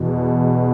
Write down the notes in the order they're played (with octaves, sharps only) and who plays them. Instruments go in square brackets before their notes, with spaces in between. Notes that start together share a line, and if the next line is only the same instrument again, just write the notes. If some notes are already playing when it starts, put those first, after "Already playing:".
Already playing: [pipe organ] E2 B2